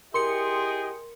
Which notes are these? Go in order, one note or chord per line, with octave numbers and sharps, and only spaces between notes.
E4 G4 G#4 A#4 D#5 G5 C6 C#7